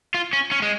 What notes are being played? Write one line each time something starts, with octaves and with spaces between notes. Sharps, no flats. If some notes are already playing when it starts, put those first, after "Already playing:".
F4
C#4
C#4
G#3